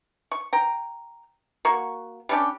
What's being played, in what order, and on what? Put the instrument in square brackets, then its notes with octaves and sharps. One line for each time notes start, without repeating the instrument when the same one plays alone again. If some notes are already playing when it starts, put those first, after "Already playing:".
[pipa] C#6
G5 A#5
A#3 F#4 C#6
G3 C#4 D4 G4